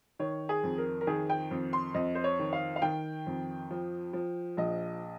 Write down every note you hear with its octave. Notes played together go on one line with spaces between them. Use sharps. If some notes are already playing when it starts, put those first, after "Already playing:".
D#3 C#5
G#4
F2
A#4
A#4
D#3 G#4
G5
F2
C6
F2 D#5
C5
C#5
D#3
F5
F5
D#3 G5
F2
F3
F3
A#1 D#5